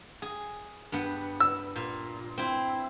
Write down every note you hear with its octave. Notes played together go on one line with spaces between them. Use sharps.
G#4
G2 B3
E6
A#2
C4 E4